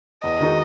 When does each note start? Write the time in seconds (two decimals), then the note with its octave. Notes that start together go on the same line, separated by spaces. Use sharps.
0.23 E2 D#5
0.41 D#3 G#3 D#4 F#4